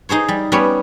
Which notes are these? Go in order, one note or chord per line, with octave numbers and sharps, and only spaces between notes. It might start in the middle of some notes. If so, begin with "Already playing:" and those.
D#4 G#4 C5 C#5
G3
G3 B3 C#4 C#5